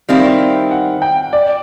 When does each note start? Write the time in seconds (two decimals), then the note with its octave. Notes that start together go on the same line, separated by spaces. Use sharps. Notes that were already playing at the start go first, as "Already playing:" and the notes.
0.09 D#3 G3 C4 E4 F5
0.71 F#5
1.02 G5
1.33 D5